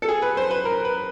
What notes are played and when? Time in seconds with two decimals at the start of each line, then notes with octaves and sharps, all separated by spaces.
0.02 A4
0.08 G#4
0.22 B4
0.37 C5
0.51 B4
0.65 A#4
0.85 B4